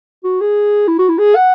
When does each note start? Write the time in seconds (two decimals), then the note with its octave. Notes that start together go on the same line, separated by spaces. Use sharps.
0.24 F#4
0.41 G#4
0.88 E4
0.99 F#4
1.09 E4
1.19 G#4
1.35 F#5